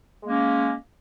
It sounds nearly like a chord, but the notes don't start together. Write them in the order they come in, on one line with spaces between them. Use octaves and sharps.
G#3 A#3 C#4